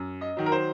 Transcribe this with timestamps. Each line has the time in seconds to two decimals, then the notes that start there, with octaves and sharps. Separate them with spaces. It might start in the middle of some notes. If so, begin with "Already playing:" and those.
Already playing: F#2
0.21 D#5
0.37 D#3 F#3
0.46 A#4
0.52 C5